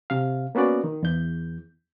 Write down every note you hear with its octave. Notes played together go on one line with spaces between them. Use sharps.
C3 F5
A#3 B3 C#4 F#4 D5
D#3
E2 G6